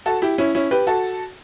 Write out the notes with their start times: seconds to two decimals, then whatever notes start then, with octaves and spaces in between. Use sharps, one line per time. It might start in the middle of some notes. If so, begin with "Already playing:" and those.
0.06 F#4 A4
0.22 E4 G4
0.38 C#4 E4
0.55 C#4 E4
0.71 G4 B4
0.87 F#4 A4